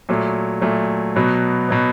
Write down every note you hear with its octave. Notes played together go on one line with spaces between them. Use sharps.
A#2 F#3 A3
A#2 F#3 A3
B2 F#3 B3
B2 F#3 B3